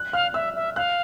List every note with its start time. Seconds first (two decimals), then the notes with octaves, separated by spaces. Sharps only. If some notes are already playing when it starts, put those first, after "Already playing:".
Already playing: F#6
0.13 F5 F6
0.34 E5 E6
0.55 E5
0.76 F5 F#6